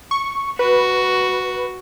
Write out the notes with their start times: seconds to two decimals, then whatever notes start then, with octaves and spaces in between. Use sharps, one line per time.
0.11 C#6
0.59 F#4 B4